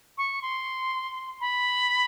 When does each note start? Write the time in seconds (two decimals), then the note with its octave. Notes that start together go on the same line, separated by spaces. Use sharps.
0.18 C#6
0.42 C6
1.41 B5